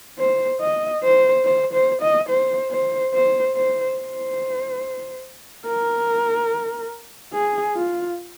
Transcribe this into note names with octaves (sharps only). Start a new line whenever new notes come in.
C5
D#5
C5
C5
C5
D#5
C5
C5
C5
C5
C5
A#4
G#4
F4